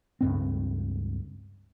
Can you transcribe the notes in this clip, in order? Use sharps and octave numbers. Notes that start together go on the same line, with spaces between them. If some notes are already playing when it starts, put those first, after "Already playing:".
C#2 G2 C4